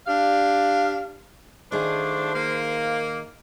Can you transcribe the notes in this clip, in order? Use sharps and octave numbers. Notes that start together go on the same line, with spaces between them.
D4 G4 D5 F5
D#3 F3 A3 D4 D#4 G#4 C5
A#3